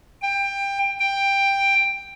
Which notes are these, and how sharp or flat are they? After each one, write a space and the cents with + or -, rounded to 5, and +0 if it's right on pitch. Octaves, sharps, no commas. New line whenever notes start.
G5 +20
G5 +10